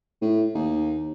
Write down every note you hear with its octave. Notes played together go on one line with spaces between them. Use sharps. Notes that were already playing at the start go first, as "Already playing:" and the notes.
A2
D#2